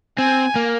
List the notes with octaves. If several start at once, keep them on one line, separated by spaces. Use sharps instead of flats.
C4 G#5
A#3